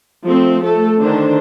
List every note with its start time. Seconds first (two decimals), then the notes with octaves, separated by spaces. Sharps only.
0.24 F3 A3 C4
0.63 A3 A4
1.02 D3 D#3 D4 C5